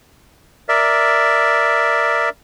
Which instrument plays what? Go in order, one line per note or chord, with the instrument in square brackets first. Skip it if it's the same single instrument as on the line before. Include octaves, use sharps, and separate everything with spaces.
[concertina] A#4 D5 E5